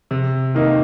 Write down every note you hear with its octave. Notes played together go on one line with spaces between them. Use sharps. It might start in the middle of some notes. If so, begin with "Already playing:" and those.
C3
D#3 A#3 D#4